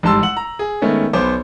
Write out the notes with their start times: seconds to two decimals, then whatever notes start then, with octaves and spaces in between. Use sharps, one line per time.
0.03 A1 G#2 G3 A5 C6 E6
0.23 F#5 F#7
0.37 A#5
0.59 G#4
0.82 D#3 G#3 A3 B3 C#4
1.13 B1 B3 C5 D6